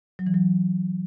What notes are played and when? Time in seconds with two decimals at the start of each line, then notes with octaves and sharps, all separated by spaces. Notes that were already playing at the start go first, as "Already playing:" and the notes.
0.19 F#3
0.27 E3
0.34 F#3